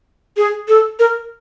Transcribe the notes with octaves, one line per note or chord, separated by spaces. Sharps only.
G#4
A4
A#4